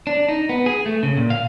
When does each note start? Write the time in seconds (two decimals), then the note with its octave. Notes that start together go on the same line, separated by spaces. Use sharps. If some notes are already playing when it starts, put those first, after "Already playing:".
0.07 D4
0.29 D#4
0.49 B3
0.66 G#4
0.86 A3
1.03 C#3
1.17 A#2
1.30 F5